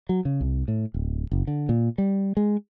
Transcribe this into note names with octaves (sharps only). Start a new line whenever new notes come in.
F#3
C#3
C2
A2
D1
F#1
D3
A#2
G3
G#3